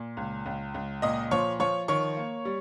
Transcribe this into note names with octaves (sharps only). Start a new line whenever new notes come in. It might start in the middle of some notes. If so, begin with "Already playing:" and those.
Already playing: A#2
C#2
C#2
C#2
A#2 D#5 D#6
F3 C#5 C#6
F3 C#5 C#6
D#3 C#5 C#6
A#3
G3